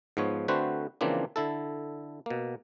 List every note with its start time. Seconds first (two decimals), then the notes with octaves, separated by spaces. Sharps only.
0.17 G#2 F3 B3 C#5
0.48 D3 A3 C4 F#4 B4 C5
1.01 C#3 E3 F3 A#3 C4 D4
1.36 D3 E4 A4
2.26 B2 A#3